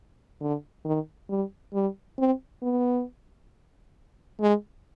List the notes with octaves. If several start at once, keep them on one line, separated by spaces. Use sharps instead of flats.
D3
D#3
G3
G3
C4
B3
G#3